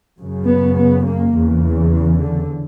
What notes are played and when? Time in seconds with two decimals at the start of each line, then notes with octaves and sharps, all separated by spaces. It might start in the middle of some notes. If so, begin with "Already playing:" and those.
0.18 F#2 C#3
0.46 B3
0.75 B3
1.04 A#3
1.33 E2 C#3
1.62 E3
2.20 D3